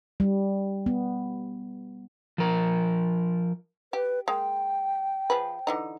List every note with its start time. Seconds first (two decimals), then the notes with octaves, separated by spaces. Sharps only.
0.20 G3
0.86 B3
2.38 F3 A#4
3.93 G4 B4
4.28 G#3 A#3 G5
5.30 F3 G#4 B4
5.67 D3 E3 D#4